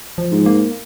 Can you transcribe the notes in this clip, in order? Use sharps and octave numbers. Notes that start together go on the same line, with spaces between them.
F3
G#2
A#3